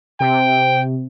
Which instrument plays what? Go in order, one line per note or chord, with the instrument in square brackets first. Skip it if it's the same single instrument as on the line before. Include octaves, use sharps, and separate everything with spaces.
[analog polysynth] C3 [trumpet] G5